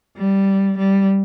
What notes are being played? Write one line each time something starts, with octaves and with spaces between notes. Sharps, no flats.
G3
G3